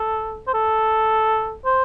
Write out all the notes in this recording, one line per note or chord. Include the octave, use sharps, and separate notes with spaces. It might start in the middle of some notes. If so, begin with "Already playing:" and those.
Already playing: A4
C5
A4
C5